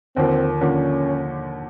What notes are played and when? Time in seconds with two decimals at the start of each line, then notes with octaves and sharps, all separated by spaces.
0.16 D#2 D3 F3 A#3 C4
0.61 D#2 D3 F3 A#3 C#4